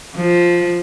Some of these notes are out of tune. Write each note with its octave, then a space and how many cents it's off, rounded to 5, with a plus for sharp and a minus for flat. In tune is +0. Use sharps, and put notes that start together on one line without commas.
F3 +0